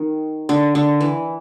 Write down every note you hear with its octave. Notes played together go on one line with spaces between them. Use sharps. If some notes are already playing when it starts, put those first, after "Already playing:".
Already playing: D#3
D3
D3
E3